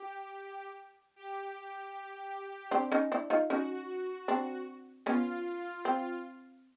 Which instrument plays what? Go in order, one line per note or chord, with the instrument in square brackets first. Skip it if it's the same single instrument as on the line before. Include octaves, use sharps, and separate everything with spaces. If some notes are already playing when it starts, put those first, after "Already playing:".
Already playing: [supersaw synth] G4
G4
[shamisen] C4 D4
C#4 D#4
D4 E4
D#4 F4
[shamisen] C#4 D#4 [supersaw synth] F#4
[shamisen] C4 D4
[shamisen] B3 C#4 [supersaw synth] F4
[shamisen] C4